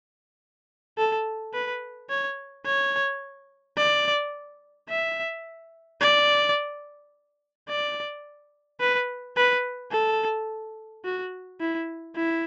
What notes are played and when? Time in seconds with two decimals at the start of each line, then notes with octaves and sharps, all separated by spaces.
0.98 A4
1.53 B4
2.10 C#5
2.66 C#5
3.77 D5
4.89 E5
6.01 D5
7.69 D5
8.80 B4
9.37 B4
9.92 A4
11.05 F#4
11.60 E4
12.16 E4